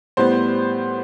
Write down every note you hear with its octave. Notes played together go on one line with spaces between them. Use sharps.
A2 G3 B3 C5